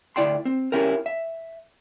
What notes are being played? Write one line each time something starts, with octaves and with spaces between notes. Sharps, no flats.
D2 E4 D5 G5 C6
C4
C#4 E4 G4 A#4
E5